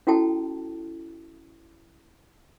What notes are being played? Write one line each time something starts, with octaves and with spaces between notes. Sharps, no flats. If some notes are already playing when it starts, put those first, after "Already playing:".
C#4 E4 F#4 A4 G5 A5